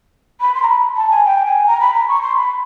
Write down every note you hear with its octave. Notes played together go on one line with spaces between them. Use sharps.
B5
C6
A#5
B5
A5
G#5
G5
G#5
A#5
B5
A#5
C#6
C6
B5